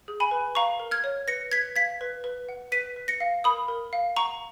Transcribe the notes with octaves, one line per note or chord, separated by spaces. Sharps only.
G#4
G#5 B5
B4
F5 A#5 C#6
A#4
F6 G#6
C#5
B4 A#6 C#7
B4 G#6 B6
F5 G#6 B6
B4
B4
F#5
B4 B6 D#7
B4
A#6 C#7
F5
A#4 B5 D#6
A#4
F5
F#5 A#5 C#6